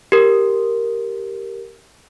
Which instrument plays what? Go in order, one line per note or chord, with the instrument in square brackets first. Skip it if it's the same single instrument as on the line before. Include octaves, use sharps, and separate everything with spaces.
[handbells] G4 A#4